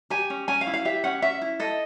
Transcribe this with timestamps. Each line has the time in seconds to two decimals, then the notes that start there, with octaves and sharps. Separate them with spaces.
0.10 G4 G#5
0.30 C#4
0.48 C#4 G#5
0.61 F5
0.67 E4
0.74 F5
0.85 G4 E5
1.04 C#4 F#5
1.22 C#4 E5
1.42 E4
1.60 A4 D#5